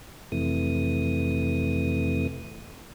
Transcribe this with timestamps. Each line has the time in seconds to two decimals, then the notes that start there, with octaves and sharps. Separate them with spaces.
0.32 F2 C3 E3 A3 D#6